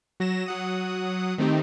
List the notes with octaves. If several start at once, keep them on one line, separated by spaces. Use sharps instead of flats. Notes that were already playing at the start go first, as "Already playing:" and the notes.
F#3 A#6 E7
F#3 F#5 D#6
D#3 A3 C4 D#4 G4